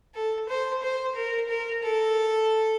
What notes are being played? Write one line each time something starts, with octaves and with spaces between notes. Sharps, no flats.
A4
C5
C5
A#4
A#4
A4